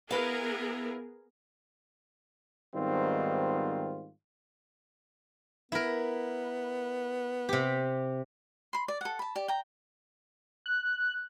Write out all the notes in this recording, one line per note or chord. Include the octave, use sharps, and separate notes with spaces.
B3 E4 G#4 A#4 B4 F5
G#2 D#3 G3 B3 C4 F4
B3 E4 A#4
C3 G4
B5 C6
D5
A4 F#5
A5 B5
G4 D5
G5 A#5
F#6